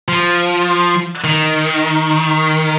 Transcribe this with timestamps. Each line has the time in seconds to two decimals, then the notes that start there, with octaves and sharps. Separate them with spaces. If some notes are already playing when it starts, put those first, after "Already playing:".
0.08 F3
1.24 D#3